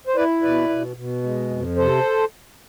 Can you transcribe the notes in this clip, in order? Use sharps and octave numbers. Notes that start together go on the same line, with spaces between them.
C5
E4 B4 D5
B2 B4 D5
B2
B2
G#3
F2
C3 A4 C5